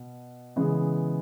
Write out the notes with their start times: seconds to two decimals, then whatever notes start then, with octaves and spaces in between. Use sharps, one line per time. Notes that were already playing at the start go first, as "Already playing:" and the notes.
Already playing: B2
0.56 C#3 E3 G#3 B3